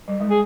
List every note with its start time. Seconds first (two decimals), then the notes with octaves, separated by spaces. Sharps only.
0.08 G3
0.20 G#3
0.30 G#4